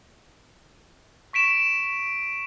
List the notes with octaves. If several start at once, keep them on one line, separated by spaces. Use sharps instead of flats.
C#6 B6 D7 E7